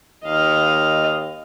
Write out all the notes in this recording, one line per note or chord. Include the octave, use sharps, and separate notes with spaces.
D#2 D#5 F5